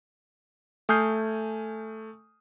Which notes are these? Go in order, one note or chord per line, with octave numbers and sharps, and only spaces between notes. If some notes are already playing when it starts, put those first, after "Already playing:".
A3 G#5 D#6 F6 G6 C7